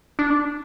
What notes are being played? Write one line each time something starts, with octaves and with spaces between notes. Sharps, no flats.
D4